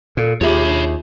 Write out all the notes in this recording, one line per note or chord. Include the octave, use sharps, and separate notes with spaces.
A#2 A4
D#2 F4 G4 G#4 C#5 E5 B5
D4